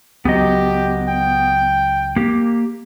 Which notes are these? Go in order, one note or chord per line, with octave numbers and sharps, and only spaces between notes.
C#2 F#3 B3 G4 D#5
G5
A#3 G4